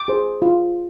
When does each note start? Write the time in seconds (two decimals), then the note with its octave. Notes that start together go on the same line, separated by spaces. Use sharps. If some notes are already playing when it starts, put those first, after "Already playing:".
Already playing: D6
0.08 G#4 C5
0.42 F4